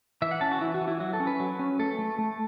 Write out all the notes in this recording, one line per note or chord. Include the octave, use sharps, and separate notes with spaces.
E3 E5
F#5
C#4 A5
F#4
E3 E4
F#4
E3
E4
F#3 F#4
A4
C#4
B4
F#3
C#4
A3 A4
A3
A3